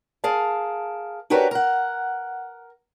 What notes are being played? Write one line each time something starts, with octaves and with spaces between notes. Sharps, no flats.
G#4 A#4 F5 A5
D4 F#4 G4 A#4 B4 C#5
A#4 F#5